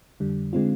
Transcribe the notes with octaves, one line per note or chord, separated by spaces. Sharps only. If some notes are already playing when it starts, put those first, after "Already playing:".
F2 D3 G3
D3 G#3 C4 F4